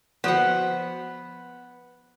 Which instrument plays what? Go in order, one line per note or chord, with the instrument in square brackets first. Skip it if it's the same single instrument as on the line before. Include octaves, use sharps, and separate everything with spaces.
[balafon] F3 F#4 [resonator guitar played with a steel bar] B3 [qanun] C5 F#5